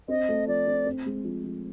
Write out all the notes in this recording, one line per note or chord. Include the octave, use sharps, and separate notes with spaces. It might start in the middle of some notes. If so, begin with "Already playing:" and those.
C4 D#5
A3
F3 D5
C4
C4
G#3
F3
F3